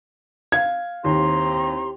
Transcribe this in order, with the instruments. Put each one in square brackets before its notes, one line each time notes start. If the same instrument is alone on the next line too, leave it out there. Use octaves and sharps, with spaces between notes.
[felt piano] F5 G#6
[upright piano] D#2 [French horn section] C4 E4 G4 [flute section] A#5 C6